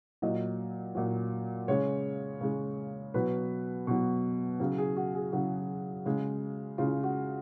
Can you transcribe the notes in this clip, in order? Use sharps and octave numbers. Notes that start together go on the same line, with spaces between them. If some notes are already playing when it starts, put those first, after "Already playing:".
A#2 F#3 D#5
A#2 F#3
C#3 G#3 C#5
C#3 G#3
B2 F#3 B4
B2 F#3
C#3 F#3
G#4
F#4
G#4
C#3 F#3 F#4
C#3 G#3
C#3 G#3 F4
F#4